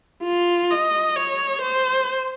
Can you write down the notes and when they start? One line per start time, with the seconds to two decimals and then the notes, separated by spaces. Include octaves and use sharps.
0.24 F4
0.71 D#5
1.16 C#5
1.62 C5